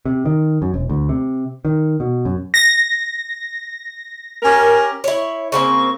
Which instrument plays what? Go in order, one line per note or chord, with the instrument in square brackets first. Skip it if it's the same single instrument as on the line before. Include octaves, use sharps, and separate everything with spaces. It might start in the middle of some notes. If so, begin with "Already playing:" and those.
[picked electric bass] C3
D#3
F#2
E1
D2
C3
D#3
B2
F#2
[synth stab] A#6
[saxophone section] C#4 G4 A#4
[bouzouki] E4 C#5
[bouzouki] C#3 A#3 C4 [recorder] C#6